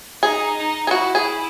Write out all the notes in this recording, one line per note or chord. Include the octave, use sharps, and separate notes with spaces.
D#4 G#4
D#4
G#4
E4 F#4
G#4